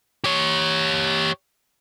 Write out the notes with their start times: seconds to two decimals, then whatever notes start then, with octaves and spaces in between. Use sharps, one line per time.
0.24 G4 C#5